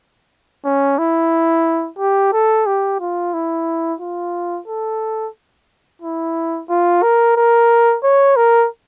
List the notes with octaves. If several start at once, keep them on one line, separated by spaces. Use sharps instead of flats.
C#4
E4
G4
A4
G4
F4
E4
F4
A4
E4
F4
A#4
A#4
C#5
A#4